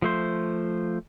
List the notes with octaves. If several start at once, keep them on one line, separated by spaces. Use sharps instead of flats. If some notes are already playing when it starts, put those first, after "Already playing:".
F3 A3 C5